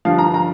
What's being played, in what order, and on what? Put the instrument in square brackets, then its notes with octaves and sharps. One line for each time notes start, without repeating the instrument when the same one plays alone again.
[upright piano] G2 D3 F3 F5
A#5
A#5